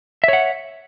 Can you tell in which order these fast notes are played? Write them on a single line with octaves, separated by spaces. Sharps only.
E5 C#5 F#5